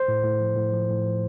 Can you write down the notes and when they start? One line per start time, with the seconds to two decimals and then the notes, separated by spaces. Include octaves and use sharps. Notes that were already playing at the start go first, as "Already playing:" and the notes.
Already playing: C5
0.08 A2
0.24 A2
0.41 F3
0.56 A2
0.73 F3
0.90 A2
1.06 F3